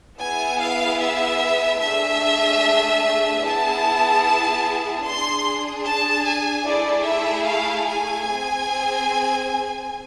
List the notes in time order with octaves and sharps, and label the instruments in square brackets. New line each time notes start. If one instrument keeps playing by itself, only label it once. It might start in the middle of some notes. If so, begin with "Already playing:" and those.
[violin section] B3 E4 G#4 G#5
F5
E5
A3 D4 G#4 E5
B3 E4 G#4 A5
D4 G#4 C6
A5
G#5
A3 E4 G#4 D5
E5
F5
G#5
C4 G#4